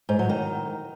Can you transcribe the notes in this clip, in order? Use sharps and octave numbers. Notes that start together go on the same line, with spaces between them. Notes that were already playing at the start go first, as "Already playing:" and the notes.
G#2
F#3
D#3